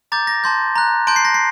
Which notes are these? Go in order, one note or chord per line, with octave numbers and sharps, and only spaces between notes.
A#5 D6 G6 A6
A#6
A5 C6 G6
A#5 F#6
A5 C6 G6 D7
C7
A#6
C7